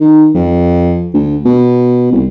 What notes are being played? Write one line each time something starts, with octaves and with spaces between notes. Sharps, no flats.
D#3
F2
D2
B2
C2